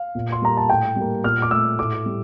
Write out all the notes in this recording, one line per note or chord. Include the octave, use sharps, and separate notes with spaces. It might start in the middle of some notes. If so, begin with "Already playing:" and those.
Already playing: F5
A#2
C6
G3 A#3 A#5
A5
A2 G5
G3 A#3
A#2 F6
D6
A3 E6
A2 D6
G3